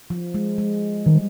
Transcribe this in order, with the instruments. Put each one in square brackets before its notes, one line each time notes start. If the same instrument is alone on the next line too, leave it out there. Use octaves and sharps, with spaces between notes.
[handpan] F3
G#3
G#3
[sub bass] D#3 [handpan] G3